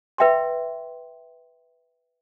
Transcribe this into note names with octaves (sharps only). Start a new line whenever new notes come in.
B4 E5 G5 C6